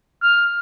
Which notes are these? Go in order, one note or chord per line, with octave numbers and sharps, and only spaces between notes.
F6